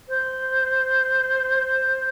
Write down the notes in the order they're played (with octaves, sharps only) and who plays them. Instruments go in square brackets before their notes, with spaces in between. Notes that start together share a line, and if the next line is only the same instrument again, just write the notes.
[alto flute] C5